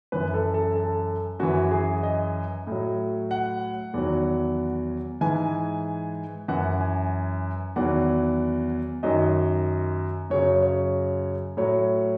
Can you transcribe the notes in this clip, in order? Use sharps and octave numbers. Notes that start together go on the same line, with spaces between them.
F#2 E3 B4
A4
A4
A4
F#2 E3 F#4
G#4
D#5
A2 F#3
F#5
E2 D#3 F#3
G#2 E3 G#5
F#2 E3 F#5
G#5
E2 D#3 F#3 F#5
F#2 D#3 F#3 D#5
F#2 C#3 F#3 C#5
C#5
A2 F#3 C#5